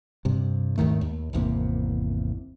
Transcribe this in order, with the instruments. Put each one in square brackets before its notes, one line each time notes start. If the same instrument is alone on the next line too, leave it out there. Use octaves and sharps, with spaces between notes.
[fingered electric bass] G2 C3
D#2 G#2 D#3 A3
D#2
G#1 E2 C3 A#3